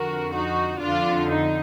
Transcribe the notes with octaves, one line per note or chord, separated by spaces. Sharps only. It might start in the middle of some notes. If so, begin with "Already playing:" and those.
Already playing: F2 D3 F#4 A#4
D#4 F#4
F2 D3 D4 F4
D#4